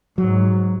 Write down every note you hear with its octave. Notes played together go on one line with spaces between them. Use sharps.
G#2 F#3